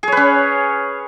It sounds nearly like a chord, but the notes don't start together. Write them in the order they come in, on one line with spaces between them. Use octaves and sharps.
G#4 C#5 B4 C#4